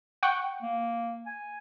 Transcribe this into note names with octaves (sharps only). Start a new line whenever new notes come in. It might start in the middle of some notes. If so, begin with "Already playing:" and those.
F#5 G5 C#6
A#3
G#5